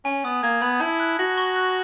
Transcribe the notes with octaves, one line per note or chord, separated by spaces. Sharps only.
C#4 G#5
B3 D#6
A#3 G#6
B3 B5
E4 A5
F#6
F#4 A#6
C#6
F#6